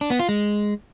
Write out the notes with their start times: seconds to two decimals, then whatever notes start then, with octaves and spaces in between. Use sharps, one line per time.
0.01 D4
0.10 B3
0.19 F4
0.29 G#3